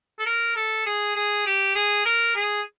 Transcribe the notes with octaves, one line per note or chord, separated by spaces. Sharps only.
A4
A#4
A4
G#4
G#4
G4
G#4
A#4
G#4